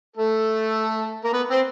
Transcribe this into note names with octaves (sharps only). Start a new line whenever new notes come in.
A3 A4
A#3 A#4
B3 B4
C4 C5